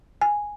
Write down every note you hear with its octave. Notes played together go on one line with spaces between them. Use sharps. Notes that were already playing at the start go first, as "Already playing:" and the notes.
G#5